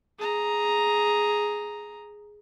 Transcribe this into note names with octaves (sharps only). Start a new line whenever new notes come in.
G#4 A#5